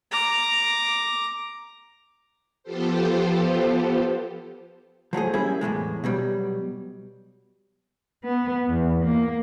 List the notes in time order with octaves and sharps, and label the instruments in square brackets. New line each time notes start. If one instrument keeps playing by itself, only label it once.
[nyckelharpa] A#5 D6
[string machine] F3 B3 F4 G4 A4 C5
[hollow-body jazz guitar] F3 F#3 A3 G#4
G3 A#3 C#4 E4 G#4
E2 A2 C#3 G#3
B2 F#3 G3
[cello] B3
E2
A#3